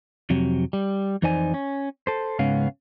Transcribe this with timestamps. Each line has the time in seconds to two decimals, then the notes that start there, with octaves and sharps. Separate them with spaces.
0.30 F2 C3 F#3
0.73 G3
1.22 F2 E3 D#4 C5 D5 G#5
1.54 C#4
2.07 A4 C5
2.39 C#2 G#2 C#3 B3 C#4 F5